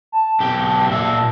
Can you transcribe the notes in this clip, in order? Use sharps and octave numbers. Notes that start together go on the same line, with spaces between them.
A5
B1 G4
A#2 E5
A5